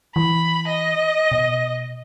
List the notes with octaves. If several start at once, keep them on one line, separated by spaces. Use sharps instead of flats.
E3 B5
D#5
B2